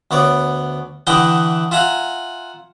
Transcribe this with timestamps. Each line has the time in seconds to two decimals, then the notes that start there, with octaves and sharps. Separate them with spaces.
0.11 D2 B3 C#5 D5
1.07 D3 E3 E4 D#5 F#5 G5
1.71 F4 E5 F#5 G#5 A#5